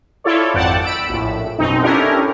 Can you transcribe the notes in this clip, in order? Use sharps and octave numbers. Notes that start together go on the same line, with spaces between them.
E4 F4 A4 C#5 D5
G#1 F2 D5 F#5 G5 A5
B5 E6 D7
A#1 A2
F#2 B2 C4 D#4
C#4 D4 E4 G4 A4 A#4